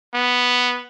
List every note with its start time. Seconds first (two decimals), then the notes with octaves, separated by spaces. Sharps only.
0.14 B3